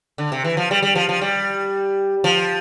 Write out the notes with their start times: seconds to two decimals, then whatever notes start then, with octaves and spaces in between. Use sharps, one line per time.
0.18 D3
0.32 C3
0.45 E3
0.57 F3
0.71 G3
0.83 G3
0.95 F3
1.09 F3
1.21 G3
2.24 F3